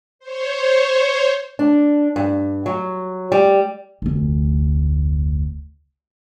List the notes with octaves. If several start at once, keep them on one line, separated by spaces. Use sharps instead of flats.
C5 C#5
D4
G2
F#3
G3
F1 D2